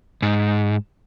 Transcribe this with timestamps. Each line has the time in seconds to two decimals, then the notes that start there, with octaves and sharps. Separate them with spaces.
0.22 G#2